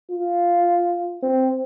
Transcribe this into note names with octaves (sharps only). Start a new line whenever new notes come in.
F4
C4